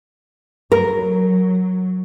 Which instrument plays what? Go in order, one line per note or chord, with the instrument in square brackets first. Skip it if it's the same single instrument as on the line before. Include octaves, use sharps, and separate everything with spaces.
[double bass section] F#3 [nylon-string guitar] A#4